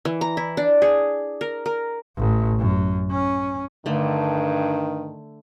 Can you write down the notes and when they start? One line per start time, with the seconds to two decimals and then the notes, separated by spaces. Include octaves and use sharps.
0.05 E3
0.21 A#5
0.37 E4
0.57 D4
0.82 G#4
1.41 A#4
1.66 A#4
2.18 A1
2.59 F#2
3.11 C#4
3.86 G2 D3 D#3 A3